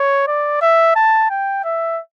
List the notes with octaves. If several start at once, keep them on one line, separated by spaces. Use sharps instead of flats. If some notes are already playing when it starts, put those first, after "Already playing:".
Already playing: C#5
D5
E5
A5
G5
E5